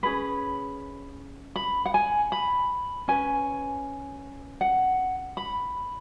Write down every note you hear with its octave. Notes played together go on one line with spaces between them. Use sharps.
C#4 G#4 B4 B5
B5
F#5
G#5
B5
C#4 B4 G#5
F#5
B5